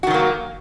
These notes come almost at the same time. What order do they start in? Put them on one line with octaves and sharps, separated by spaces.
F#4 D#3 F#3 A#3